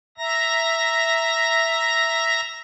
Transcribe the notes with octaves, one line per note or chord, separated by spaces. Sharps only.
E5 A#5 A#6